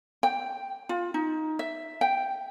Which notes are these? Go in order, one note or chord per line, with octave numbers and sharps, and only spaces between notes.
G5
F4
D#4
E5
G5